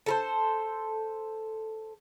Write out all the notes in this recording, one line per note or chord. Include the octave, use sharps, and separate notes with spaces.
A4 A#4 C5